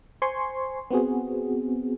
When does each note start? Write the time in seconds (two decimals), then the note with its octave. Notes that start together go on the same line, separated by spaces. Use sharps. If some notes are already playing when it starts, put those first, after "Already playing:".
0.22 C5 G#5 C6 C#6
0.91 B3 C4 F#4 G#4